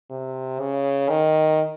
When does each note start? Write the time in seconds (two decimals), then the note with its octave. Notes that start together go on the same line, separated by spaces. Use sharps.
0.10 C3
0.59 C#3
1.09 D#3